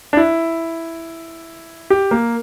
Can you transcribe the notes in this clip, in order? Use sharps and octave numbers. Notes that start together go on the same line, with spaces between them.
D4
E4
G4
A#3